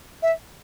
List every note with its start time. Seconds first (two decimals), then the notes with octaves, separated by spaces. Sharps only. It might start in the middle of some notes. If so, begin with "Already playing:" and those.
0.23 E5